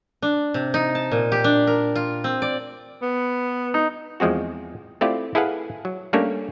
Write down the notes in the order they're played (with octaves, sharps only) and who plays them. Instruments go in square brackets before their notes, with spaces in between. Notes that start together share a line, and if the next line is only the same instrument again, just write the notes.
[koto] D4
C3
D#4
A5
A#2
G4
D4
A#4
F4
C4
D5
[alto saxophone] B3
[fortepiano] D#4
[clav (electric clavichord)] E2 F3 G#3 C4 F#4
A3 C4 E4 F4 G4 D5
E4 G#4 A4 B4 F5 F#5
F#3
G3 A3 A#3 C#4 D4 C#5